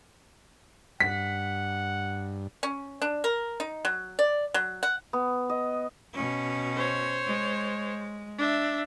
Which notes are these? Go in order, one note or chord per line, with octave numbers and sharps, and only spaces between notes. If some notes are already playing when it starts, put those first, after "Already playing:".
G2 F#5 B6
C#4
D4
A#4
D#4
F#3
D5
F#3
F#5
B3
D#5
B2 C#4
C5 C#5
G#3
D4 E5